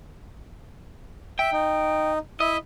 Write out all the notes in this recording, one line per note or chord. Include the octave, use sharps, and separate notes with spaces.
E5 G5
D#4
E4 D#5 E5